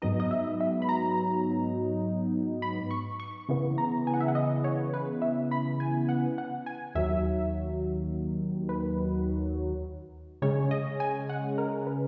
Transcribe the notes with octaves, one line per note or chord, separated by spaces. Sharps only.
G#2 F#3 B3 D#4 D#5
D#5
E5
E5
B5
A#5
B5
C#6
C#6
C#3 E3 B3
A#5
G#5
F#5
E5
F#5
D#5
C#5
B4
E5
B5
G#5
F#5
F#5
G#5
D#2 D#3 F#3 E5
B4
C#3 G#3 C#4 C#5
D#5
G#5
F#5
A#4
B4